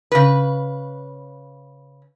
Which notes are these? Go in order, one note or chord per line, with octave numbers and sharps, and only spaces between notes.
C#3 B4